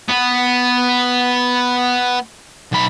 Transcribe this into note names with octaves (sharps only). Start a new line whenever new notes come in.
B3
B1 B5